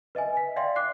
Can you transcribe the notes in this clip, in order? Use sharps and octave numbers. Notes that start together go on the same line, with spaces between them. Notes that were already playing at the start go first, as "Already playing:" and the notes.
B4 D#5 E5 G#5
B6
D5 E5 F5 G5 C6
D6 F#6 C7